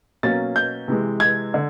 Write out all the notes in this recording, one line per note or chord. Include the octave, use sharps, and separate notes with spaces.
B2 F#3 A#3 C#4 A6
G6
C3 E3 G#3
G#6
D3